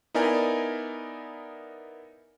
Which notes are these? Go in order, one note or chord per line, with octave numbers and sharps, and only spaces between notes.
B3 D#4 E4 A#4 D5 G#5